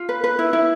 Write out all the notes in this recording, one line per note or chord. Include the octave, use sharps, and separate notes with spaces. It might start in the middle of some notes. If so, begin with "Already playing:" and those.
Already playing: F4
B4
B4
E4
E4